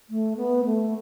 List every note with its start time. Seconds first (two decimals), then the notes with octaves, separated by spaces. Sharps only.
0.10 A3
0.37 B3
0.65 A3